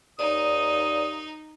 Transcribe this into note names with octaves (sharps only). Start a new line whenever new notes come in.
D#2 D#4 D5 D#6